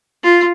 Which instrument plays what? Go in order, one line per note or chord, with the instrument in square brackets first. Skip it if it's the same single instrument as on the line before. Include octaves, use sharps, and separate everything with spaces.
[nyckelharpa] F4